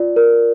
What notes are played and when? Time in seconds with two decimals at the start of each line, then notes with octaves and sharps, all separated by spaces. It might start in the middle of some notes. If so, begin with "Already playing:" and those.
Already playing: F4 D5
0.16 A#4